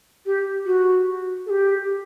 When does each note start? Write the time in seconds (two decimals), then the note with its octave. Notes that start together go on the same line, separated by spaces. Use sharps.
0.25 G4
0.65 F#4
1.46 A4
1.49 G4